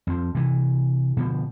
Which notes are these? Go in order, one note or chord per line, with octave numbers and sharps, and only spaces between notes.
F2 F3
C3 E3
B2 D3 F3